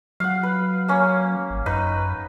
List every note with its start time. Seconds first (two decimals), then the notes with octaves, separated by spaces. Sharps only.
0.20 F#3 F5 F#5
0.43 B4
0.88 A#3 C#4
1.50 G#1
1.66 F#2 D#4 B4